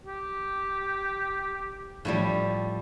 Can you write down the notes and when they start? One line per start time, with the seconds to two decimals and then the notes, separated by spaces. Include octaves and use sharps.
0.05 G4
2.05 A2 F3 G3